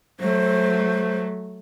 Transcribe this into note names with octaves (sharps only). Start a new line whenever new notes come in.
F#3 A3 C5